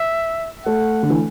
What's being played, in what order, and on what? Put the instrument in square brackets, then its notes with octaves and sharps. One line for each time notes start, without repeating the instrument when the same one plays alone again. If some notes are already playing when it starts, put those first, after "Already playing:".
Already playing: [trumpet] E5
[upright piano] A3 [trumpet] F#5
[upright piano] D3
E3